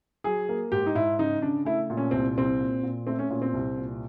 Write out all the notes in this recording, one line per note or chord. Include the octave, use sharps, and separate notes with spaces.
F#3 G#4
A#3
G#2 G4
D#4
G#2 E4
C#3 D#4
C#3 D4
A3 E4
A#2
C#4
C2 C4
C2 C4
A#2
A#2
A3 C4
C#4
A#2 C#4
C4
C2
A#2